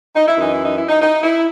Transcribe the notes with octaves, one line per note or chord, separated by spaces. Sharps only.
D#4
E4
F#2 E3 D#4
E4
D#4
E4
D#4
D#4
E4